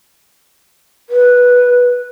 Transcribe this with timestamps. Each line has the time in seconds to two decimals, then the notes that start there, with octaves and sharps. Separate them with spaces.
1.10 B4